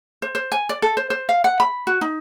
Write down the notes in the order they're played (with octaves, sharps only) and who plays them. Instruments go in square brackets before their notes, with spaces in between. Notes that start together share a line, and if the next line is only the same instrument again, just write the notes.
[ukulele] C5
C5
G#5
D5
A4
C5
C5
F5
F#5
B5
F#4
D#4